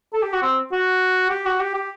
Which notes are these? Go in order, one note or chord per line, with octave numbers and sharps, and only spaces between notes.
A4
G4
F#4
C4
F#4
G4
F#4
G4
G4